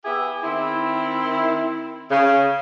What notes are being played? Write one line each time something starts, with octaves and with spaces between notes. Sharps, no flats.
B3 E4 G4 G#4 E5
D#3 C4 E4
C#3